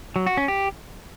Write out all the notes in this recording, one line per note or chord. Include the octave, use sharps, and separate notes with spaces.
F#3
F#4
C#4
G4